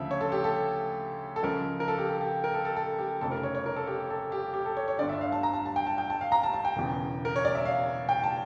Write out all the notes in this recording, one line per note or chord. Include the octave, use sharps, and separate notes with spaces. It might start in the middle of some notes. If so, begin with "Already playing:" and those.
Already playing: D2 C#3 F3 E5
C#5
A4
G4
A4
A4
C#2 C#3 F3 A#4
A#4
A4
G4
A4
G4
A#4
A4
A4
A4
G4
F1 F2 C#3 A4
A#4
C#5
C#5
A#4
A4
G4
A4
G4
G4
A4
C#5
C#5
G1 G2 D3 D5
E5
F5
A5
A#5
A5
A5
G5
A5
G5
A5
F5
A#5
A5
A5
G5
E1 E2 C#3
A#4
C#5
D5
E5
F5
G5
A5